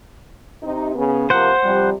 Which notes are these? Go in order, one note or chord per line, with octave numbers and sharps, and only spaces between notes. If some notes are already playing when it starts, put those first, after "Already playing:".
C3 D#4
C#3 B3
C3 F3 A#3 C5 F#5
C3 F3 G3